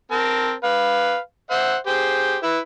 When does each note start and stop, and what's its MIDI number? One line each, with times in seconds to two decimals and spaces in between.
0.11 0.53 60
0.11 0.53 70
0.11 0.53 81
0.64 1.18 71
0.64 1.18 77
1.51 1.76 72
1.51 1.76 76
1.51 1.76 78
1.87 2.37 67
1.87 2.37 68
1.87 2.37 72
2.43 2.58 64
2.43 2.58 71